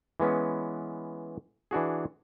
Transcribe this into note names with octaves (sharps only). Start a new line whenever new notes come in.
E3 G#3 B3 C#4
E3 D4 F#4 G#4